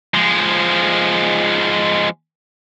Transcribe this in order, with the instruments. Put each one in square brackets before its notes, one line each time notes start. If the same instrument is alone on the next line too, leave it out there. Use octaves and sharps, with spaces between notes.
[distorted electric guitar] F3 G#3